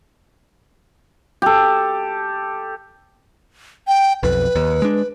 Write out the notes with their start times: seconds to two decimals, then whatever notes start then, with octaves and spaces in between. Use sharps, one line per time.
1.42 G4 A4
3.87 G5
4.23 B1 F2 B4
4.55 D#2
4.82 G#3 D4